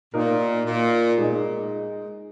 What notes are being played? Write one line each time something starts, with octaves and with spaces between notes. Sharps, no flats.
A#2 A#3 D#4 A#4
A#2
G#3 D#4 G#4 D#5